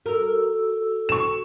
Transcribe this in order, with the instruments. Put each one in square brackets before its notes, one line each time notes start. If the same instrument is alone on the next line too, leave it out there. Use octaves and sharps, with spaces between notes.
[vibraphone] F#4 A4 E6 [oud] A#4
[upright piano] C#6 E7